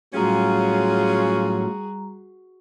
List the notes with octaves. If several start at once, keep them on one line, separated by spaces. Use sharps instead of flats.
A2 F#3 G3 C#4 F4 F#4 G#4 A#5